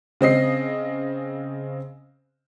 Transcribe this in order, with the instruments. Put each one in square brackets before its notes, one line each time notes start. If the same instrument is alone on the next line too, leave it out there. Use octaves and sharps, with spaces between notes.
[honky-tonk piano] C#3 C4 D#5 C7